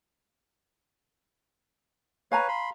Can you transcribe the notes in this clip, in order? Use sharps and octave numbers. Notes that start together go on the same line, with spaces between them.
B4 C#5 F5 G#5 A#5
B5 C6